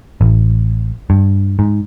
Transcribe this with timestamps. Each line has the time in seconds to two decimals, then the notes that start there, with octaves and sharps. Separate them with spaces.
0.21 A1
1.10 G2
1.59 G#2